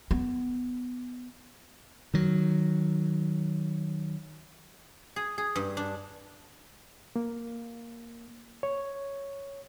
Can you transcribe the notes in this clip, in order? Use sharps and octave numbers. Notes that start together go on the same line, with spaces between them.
B3
D#3 F#3
G#4
G#4
G2
D4
A#3
C#5